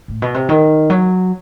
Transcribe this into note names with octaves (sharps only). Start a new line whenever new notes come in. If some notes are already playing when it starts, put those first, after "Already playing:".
A2
B2
C3
D#3
F#3